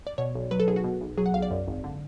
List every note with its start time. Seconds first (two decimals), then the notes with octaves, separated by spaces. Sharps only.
0.07 D5
0.18 B2 C#5
0.35 B1
0.51 F#3 B4
0.60 A4
0.68 B1 G#4
0.76 F#4
0.84 B2
1.01 B1
1.18 F#3 G#4
1.26 F#5
1.34 B1 F5
1.42 D5
1.50 F#2
1.67 G#1
1.84 D3